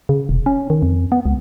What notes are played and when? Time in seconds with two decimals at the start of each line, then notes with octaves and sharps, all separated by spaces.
0.09 C#3
0.29 E1
0.46 C#4
0.70 D#3
0.83 F2
1.12 B3
1.26 C#2